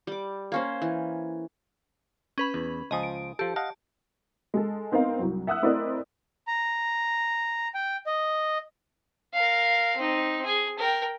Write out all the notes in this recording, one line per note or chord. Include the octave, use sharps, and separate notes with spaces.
G3 D6
A#3 C#4 C5
E3
C#4 B4 B5
E2
C#2 F3 D#5 G#5 D#6
D7
F3 G4 A4
D#5 F5 F#5 A5
G#3 A4
B3 C4 D#4 A#4 F5
C2 F#3
E5 F#5 D#6 E6 F#6
A3 C4 E4 A#4 D5 D#5
A#5
G5
D#5
A#4 F5
C4 D#4
G#4
A#4 G5